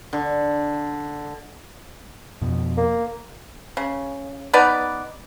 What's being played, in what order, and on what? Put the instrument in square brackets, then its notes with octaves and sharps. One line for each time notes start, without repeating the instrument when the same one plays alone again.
[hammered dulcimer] D3
[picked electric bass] F2 B2
[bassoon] A#3
[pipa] C#3
B3 D#4 B4 D5